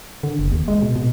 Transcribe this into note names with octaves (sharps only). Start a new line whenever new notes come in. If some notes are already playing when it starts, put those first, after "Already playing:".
D3
F#1
D#2
G#3
B2
B2